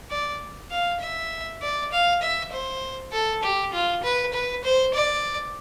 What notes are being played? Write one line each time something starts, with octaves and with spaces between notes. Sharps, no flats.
D5
F5
E5
D5
F5
E5
C5
A4
G4
F4
B4
B4
C5
D5